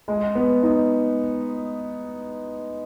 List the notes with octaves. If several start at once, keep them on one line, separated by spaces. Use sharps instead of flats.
G#3
B3
D#4